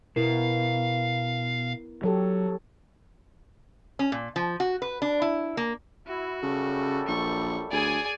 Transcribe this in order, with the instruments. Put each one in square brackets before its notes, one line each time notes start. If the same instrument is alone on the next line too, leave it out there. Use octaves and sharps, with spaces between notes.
[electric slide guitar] B2 [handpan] B3 E4 A#4 [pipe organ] F5
[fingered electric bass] F#3 [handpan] G4 A4 C#5
[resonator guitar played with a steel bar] C#4
A#2
F3
F#4
B4
D4
E4
A#3
[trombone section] E4 [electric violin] F#4
[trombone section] F#2 G3 A4 [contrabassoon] C#3
[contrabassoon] A#1 [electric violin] C#6
[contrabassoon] D2 [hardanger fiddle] G#4 G#5 [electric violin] D5